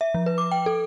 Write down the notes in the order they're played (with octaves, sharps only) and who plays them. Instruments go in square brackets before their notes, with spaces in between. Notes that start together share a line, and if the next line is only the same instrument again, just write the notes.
[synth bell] E5
F3
B4
D6
G5
A4